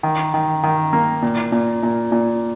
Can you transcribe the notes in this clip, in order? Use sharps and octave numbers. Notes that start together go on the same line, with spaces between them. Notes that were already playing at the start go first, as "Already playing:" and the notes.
D#3
D#3
D#3
A#3
A#2
A#2
A#2
A#2